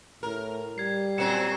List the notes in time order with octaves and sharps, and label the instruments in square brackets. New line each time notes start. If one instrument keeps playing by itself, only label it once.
[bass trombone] A2 [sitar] A#4
[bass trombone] G3 [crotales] G#6 C7
[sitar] A#2 F#3 C4 [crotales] C#7 E7